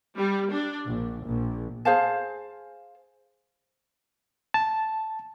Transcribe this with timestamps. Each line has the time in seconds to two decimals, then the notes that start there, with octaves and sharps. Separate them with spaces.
0.18 G3
0.53 D4
0.87 A#1
1.25 A#1
1.85 G#4 C5 F5 A5
4.54 A5